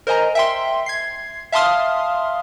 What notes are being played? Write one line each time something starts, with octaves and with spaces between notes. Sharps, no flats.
A#4 C5 D#5 G#5 A#5
E5 G5 C6
G#6 C7
E5 F5 A5 C6 D#6 F6